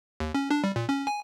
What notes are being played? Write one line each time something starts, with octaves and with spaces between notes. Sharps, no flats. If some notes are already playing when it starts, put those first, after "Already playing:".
D#2
C#4
D4
G3
A#2
C#4
G#5